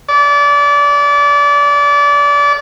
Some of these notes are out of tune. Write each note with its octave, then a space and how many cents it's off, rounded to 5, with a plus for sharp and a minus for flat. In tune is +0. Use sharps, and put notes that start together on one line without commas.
D5 -30